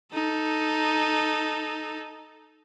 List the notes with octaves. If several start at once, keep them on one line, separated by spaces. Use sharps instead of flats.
D#4 A4